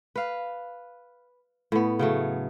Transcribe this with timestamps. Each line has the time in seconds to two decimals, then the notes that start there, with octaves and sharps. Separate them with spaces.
0.16 B4 F5
1.72 A2 B3
1.99 C#3 F#3 A3